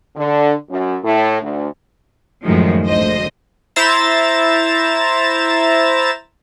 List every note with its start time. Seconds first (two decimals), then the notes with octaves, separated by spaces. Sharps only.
0.16 D3
0.70 F#2
1.04 A2
1.41 D2
2.44 F#2 A2 D#3 F3 G#3
2.86 G#1 D2 C5 D#5
3.76 E4 C5 E5 A#5 A6 E7